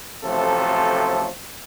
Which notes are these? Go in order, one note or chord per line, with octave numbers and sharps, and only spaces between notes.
A1 C3 F3 F#3 A3 A4